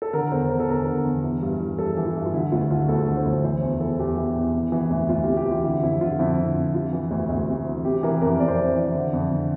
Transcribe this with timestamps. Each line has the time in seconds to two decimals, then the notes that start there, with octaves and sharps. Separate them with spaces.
0.02 A4
0.13 D3 A#4
0.31 E2 C5
0.50 D3 A#4
0.60 A4
0.69 E2 A#4
0.87 D3
1.05 E2
1.23 E3
1.42 G2
1.60 E3
1.78 G2 A4
1.97 E3
2.06 F4
2.15 G2
2.25 F4
2.33 D3 E4
2.52 D2 F4
2.70 D3 F4
2.89 D2 A4
3.07 D3
3.16 C5
3.25 D2
3.43 E3 C5
3.62 E2
3.80 E3 A4
3.99 E2 G4
4.17 E3
4.36 E2
4.54 C3
4.72 E3
4.90 D2
5.04 E4
5.09 D2 F4
5.23 C3 G4
5.37 G4
5.46 E3 F4
5.64 D3 E4
5.82 F2 E4
6.01 D3 F4
6.19 F2 E4
6.38 D3
6.56 F2
6.74 C3 F4
6.93 E3
7.11 D2
7.29 D2
7.48 C3
7.67 E3
7.84 C3 G4
8.03 E3 A#4
8.21 F2 A#4
8.39 F2 D5
8.48 C5
8.56 C3 D5
8.76 E3
8.95 D3
9.13 F2
9.32 D3